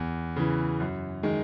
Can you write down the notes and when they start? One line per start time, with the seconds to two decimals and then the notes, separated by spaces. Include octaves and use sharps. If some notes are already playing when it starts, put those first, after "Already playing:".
Already playing: E2
0.36 C#3 E3
0.80 F#2
1.23 D#3 G#3